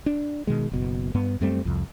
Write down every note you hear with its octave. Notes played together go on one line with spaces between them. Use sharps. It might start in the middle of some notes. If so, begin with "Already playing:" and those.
D4
B2 D#3 G#3
F#1 B2
G2 B3
F#2 G3 A3 C4
C2 F2